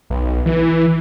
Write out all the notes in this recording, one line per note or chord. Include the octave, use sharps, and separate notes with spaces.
B1
E3